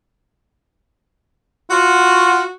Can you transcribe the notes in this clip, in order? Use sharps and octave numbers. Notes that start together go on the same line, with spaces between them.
F4 F#4